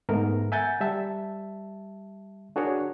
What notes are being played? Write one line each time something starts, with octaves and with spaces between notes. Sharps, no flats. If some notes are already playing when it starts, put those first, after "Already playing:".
G#2 A3 B3 A#4
E5 F#5 G#5 A#5 G6 A6
G3 E5 A5
D4 F#4 G#4 A#4 C#5